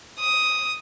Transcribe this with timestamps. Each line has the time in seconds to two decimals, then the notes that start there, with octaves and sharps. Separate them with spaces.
0.20 D#6